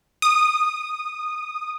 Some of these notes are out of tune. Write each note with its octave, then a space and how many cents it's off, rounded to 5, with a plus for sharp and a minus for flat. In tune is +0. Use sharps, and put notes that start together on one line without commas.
D#6 -15